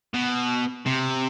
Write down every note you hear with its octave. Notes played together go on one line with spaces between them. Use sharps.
B2
C3